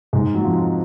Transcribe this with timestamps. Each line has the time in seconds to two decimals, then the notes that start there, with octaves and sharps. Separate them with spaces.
0.13 G#2 G#3
0.34 F#3
0.45 F2 F3